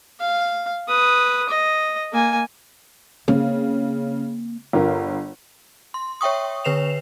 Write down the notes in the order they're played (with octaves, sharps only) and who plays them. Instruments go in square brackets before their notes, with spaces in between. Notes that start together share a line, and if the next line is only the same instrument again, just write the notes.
[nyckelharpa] F5
B4 D#6
D#5
A#3 G#5
[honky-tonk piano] C#3 [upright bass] A#3 C4
[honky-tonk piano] G1 F4 A#4
[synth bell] C6
C#5 E5 G5 C#6 D#6
D3 B4 C#5 C7 E7 F7